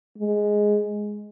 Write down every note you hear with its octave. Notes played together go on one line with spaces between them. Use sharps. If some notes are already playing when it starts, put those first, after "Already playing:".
G#3